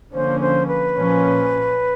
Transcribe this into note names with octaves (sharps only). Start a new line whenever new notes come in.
D3 F3 A#3 C#4 C5
C5
B4
A#2 F3 A#3 C#4